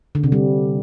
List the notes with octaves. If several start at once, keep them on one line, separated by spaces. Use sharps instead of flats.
D3
C3
G3